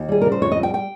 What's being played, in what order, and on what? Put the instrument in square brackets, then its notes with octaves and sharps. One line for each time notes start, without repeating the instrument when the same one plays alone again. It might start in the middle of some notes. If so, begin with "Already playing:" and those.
Already playing: [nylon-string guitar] D#2
G3 G#4
C#3 A#4
C5
F2 C#5
D#5
G3
G5
G5